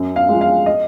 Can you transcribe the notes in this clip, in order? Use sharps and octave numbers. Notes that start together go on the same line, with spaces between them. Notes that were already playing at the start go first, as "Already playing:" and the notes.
Already playing: F#2
F5
F3 G#3
F5
D#5